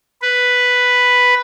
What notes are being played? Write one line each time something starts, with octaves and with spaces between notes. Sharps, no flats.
B4